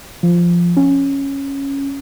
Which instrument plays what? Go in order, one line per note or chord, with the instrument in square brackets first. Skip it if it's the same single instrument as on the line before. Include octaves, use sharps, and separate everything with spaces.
[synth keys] F3
C#4